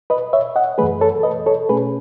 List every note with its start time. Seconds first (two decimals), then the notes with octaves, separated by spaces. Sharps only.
0.10 B4 D#5
0.33 C#5 E5
0.56 D#5 F#5
0.78 F#2 E3 A3 G#4 B4
1.01 A4 C#5
1.23 B4 D#5
1.46 A4 C#5
1.69 B2 A3 C#4 G#4 B4